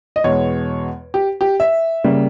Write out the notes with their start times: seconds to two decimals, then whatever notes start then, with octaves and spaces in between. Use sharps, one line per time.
0.16 D#5
0.24 E2 B2 G#3 C#5
1.14 G4
1.41 G4
1.60 E5
2.04 C#3 G3 A#3